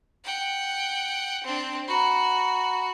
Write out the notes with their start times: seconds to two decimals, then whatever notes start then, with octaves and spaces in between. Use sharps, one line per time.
0.24 F#5 G5
1.44 C4 D4
1.88 F#4 F#5 A#5 B5